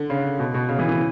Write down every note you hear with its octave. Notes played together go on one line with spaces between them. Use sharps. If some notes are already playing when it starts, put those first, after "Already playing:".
Already playing: D3
C#3
B2
B2
C#3
E3
E3